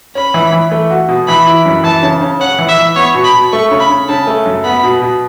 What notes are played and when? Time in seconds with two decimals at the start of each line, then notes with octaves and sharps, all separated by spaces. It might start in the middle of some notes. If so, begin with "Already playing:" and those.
0.15 C#4 B5
0.34 E3
0.53 E3
0.71 A3
0.90 F#4
1.08 B2
1.28 E3 B5
1.47 E4
1.65 F#2
1.84 E3 A5
2.03 C#3
2.21 C#3
2.40 C#4 F#5
2.59 E3
2.68 E5
2.78 E3
2.96 B3 C#5
3.15 B2
3.24 B5
3.34 B2
3.52 A3 C#6
3.71 C#3
3.80 B5
3.90 C#3
4.08 C#3 A5
4.27 A3
4.46 F#2
4.64 B3 B5
4.83 B2
5.02 B2